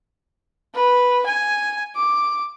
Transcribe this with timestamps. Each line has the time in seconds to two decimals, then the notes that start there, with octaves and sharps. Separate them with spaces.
0.74 B4
1.26 G#5
1.95 D6